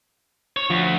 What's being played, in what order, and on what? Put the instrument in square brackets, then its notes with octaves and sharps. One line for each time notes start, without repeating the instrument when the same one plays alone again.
[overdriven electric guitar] C#5
[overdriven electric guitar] D2 [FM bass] F3